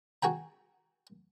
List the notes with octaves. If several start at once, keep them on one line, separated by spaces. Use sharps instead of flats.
F#4 G#4 G5 A#5